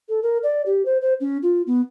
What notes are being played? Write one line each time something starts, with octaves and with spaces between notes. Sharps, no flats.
A4
A#4
D5
G4
C5
C5
C#4
F4
B3